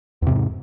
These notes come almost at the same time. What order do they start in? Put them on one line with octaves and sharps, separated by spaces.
E2 C3 G#2